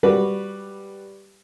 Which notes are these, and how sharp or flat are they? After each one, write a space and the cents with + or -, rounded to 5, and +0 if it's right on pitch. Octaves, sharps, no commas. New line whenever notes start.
G3 +0 F#4 +0 B4 +0